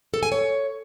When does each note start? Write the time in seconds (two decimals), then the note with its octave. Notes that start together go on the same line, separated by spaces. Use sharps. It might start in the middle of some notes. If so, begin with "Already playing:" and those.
0.14 A4
0.23 G#5
0.32 C#5